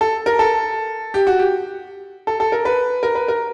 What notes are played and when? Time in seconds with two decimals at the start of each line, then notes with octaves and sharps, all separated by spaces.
0.01 A4
0.26 A#4
0.39 A4
1.14 G4
1.27 F#4
1.39 G4
2.27 A4
2.40 A4
2.52 A#4
2.65 B4
3.03 A#4
3.15 B4
3.28 A#4